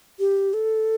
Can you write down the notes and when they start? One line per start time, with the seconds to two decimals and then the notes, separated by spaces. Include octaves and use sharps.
0.20 G4
0.54 A4